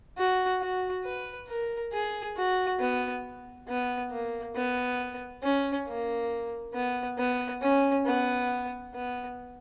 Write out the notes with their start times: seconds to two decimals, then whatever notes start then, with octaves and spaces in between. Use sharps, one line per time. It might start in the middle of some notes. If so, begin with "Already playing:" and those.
0.18 F#4
0.61 F#4
1.05 B4
1.48 A#4
1.93 G#4
2.37 F#4
2.80 B3
3.68 B3
4.11 A#3
4.56 B3
5.43 C#4
5.88 A#3
6.74 B3
7.18 B3
7.62 C#4
8.06 B3
8.94 B3